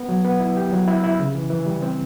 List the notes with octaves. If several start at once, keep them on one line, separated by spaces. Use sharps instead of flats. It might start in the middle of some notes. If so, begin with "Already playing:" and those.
Already playing: B3
F#3
B3
E4
G4
F#3
E4
E4
C#3
E3
E3
G3
C4